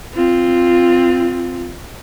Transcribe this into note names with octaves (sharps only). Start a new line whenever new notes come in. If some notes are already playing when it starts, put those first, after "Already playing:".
C4 F4